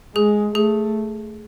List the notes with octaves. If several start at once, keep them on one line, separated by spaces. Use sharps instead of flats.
G#3 G#4
A3 G#4